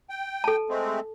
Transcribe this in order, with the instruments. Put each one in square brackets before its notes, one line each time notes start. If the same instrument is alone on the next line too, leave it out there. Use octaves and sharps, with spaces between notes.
[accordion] G5
[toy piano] A4 A5
[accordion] G#3 A3 C4